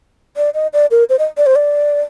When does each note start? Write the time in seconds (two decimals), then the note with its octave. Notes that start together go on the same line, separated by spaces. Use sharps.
0.37 D5
0.54 D#5
0.73 D5
0.91 A#4
1.09 C5
1.19 D#5
1.37 D5
1.46 C5
1.56 D5